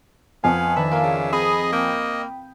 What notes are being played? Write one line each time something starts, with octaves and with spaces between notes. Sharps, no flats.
F2 B3 F5 G#5
D#3 D4 B4 E5 A5
A#3 F4 A#4 F5
C#3
C4 G#4 D#5 B5 D#6
A#3 G5